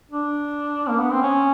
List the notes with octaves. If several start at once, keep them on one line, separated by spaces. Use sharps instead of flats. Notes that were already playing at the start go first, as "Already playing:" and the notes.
D4
A#3
B3
C4
C#4